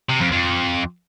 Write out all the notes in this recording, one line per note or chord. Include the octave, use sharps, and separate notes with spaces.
C3
F2
F2